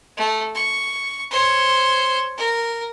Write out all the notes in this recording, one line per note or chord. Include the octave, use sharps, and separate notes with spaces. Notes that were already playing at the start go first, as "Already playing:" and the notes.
A3
C#6
C5 C#5
A#4